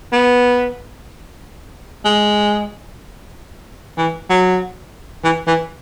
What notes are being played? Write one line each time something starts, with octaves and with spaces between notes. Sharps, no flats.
B3
G#3
E3
F#3
E3
E3